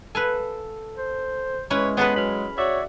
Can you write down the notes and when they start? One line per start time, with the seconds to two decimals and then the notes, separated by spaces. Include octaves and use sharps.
0.15 A4 B4 F5 G#5
0.97 C5
1.70 G#3 C#4 E4 B4 C#5
1.97 B3 C#4 G#4 A4 B4 D#6
2.16 F#3 B5 F6
2.58 F#4 C#5 D5 E5